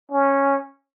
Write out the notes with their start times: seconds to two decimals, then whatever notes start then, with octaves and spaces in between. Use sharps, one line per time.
0.11 C#4